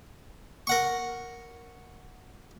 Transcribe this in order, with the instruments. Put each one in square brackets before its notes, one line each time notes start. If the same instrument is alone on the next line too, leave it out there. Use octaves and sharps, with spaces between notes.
[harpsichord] A#4 F#5 C#6